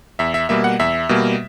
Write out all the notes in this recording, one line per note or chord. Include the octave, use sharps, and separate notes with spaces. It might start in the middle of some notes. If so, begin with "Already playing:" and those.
E2 E5
E5
B2 G3 A#3 E5
F#5
E2 E5
B2 G3 A#3